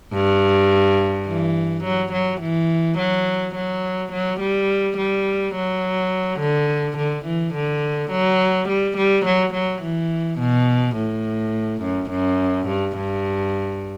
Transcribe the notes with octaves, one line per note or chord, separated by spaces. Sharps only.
G2
E3
F#3
F#3
E3
F#3
F#3
F#3
G3
G3
F#3
D3
D3
E3
D3
F#3
G3
G3
F#3
F#3
E3
B2
A2
F#2
F#2
G2
G2